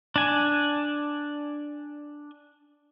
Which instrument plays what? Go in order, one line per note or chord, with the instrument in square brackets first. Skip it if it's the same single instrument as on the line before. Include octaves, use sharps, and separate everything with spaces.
[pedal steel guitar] D4 G#5